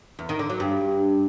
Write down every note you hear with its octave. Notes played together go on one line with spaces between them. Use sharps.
E2
D#3
D3
F#3
G2